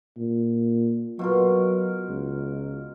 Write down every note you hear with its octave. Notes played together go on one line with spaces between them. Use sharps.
A#2
B2 F#3 F4 A#4
C#2